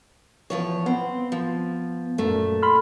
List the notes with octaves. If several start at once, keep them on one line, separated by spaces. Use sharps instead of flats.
E2 F3 C#5
B3 C4
F3
F#2 A#2 A3
B5 C6 F6